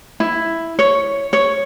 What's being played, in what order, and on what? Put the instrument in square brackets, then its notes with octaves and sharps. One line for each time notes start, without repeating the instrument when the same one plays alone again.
[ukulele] E4
C#5
C#5